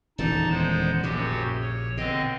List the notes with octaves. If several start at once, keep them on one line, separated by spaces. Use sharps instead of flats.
D#1 E2 D3 D#4 A5 A6
G#3 B3 C5
A#1 F#2 C#3 F#4 G4
C#5
B2 D3 C4 D#5